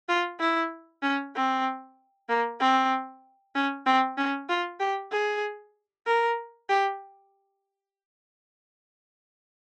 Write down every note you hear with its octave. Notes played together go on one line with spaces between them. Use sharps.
F4
E4
C#4
C4
A#3
C4
C#4
C4
C#4
F4
G4
G#4
A#4
G4